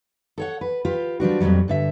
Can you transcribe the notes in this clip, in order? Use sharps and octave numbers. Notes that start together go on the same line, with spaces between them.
A4 C#5 F#5
B4
F4 G4 B4
F3 G3 D4 F#4
F2 A#2 D3 F#3 G3
G2 D3 E5